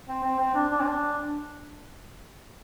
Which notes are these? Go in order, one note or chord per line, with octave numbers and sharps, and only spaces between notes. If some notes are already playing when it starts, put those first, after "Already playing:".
C4
C4
C4
D4
D4
C4
D4